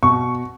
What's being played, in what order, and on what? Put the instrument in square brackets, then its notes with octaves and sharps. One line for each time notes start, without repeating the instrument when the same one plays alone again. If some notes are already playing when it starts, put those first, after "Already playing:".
[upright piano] B2 C#6